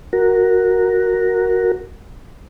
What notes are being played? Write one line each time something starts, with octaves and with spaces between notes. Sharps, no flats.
F#4 A#4